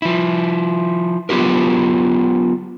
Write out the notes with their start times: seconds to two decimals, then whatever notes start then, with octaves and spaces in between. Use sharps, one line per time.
0.02 F3 E4
1.29 F#3 B3 F4 G4 A#4